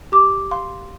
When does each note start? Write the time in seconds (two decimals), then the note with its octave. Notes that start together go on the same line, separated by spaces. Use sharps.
0.12 G4 D6
0.51 F5 C6